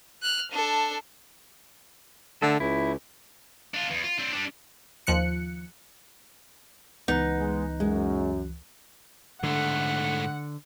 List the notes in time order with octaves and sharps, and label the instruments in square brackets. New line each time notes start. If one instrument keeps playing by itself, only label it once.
[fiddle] F6 F#6
D4 A4
[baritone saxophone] D3 [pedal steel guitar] A3 A4
[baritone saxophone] C#2 [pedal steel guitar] E4
[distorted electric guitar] D4 F4
E2
F4
C4 D4
G3 D4
[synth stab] D#2 F3 F#6 C#7
[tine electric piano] C#2 E3 F#6 [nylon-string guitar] B3 [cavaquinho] D#4
[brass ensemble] G#3
[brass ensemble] F#2 [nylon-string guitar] G#3
[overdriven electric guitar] G#2 A3 [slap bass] D3 [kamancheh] F#5